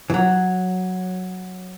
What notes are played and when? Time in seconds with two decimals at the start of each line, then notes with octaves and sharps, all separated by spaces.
0.10 E3
0.14 F#3